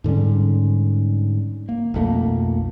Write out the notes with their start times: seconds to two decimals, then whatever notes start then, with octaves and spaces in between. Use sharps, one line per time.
0.04 G#2 D3 G3 C#4
1.69 A#3
1.94 B1 F2 A3 A#3